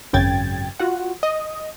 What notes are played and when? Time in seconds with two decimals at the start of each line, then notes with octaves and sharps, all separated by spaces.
0.13 G#1 F#2 C#3 G5 G#6 A6
0.79 F4 F#4 F#5
1.23 D#5